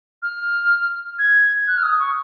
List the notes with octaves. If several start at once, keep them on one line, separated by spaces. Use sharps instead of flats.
F6
G#6
F#6
F6
D#6
C#6